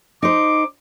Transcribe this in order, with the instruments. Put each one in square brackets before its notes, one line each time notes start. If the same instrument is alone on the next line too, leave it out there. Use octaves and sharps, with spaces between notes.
[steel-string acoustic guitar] D#4 C5 [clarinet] D6